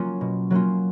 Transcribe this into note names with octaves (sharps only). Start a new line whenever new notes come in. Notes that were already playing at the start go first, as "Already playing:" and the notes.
Already playing: F#3 A#3 C#4 F4
B2
F#3 A#3 C#4 F4